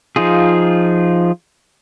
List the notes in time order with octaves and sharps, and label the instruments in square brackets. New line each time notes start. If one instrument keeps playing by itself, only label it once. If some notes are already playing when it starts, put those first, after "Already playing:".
[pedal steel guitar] F3 D#4 F4 G#4